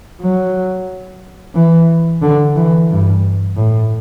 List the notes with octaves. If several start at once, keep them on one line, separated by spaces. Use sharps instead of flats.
F#3
E3
D3
E3
G2
A2